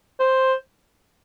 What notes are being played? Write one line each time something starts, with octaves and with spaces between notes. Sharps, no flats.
C5